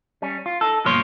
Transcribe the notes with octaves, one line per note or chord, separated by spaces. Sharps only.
G3 C#4
F4
D#4 A4
G2 B2 F3 A#3 C#5 C6